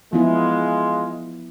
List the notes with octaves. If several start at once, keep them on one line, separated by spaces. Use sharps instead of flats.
F3 G#3 B3 E4 F4